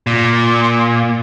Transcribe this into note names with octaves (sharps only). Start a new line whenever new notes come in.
A#2